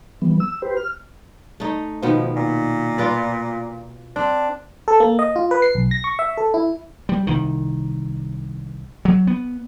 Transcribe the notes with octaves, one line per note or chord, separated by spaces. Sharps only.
E3 G3 B3
E6
G4 B4 C5
F6
A3 D#4
B2 D#3 F3 B3
A#2
F4 B4 D5
C4 D4
A4
A#3
D#5
F4
B4
C7
B1
A#6
C#6
E5
A4
E4
G3
C2 D#3
F#3
B3